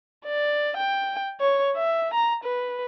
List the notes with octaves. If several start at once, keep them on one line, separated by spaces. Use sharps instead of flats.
D5
G5
C#5
E5
A#5
B4